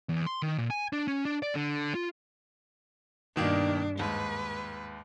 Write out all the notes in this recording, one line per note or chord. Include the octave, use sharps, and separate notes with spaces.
E2
C6
D#3
A#2
G#5
D4
C#4
D4
D5
D3
F4
G2 B2 D#3 A#3 D4
D#2 G#2 B4